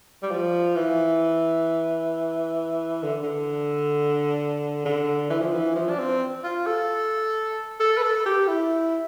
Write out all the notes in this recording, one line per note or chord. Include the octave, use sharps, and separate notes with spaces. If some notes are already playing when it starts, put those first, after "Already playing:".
G3
F3
E3
D3
D3
D3
E3
F3
E3
F3
D4
C4
F4
A4
A4
B4
A4
G4
E4